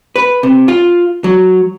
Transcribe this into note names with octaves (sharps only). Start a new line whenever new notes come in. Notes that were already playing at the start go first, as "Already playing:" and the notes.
B4
C3
F4
F#3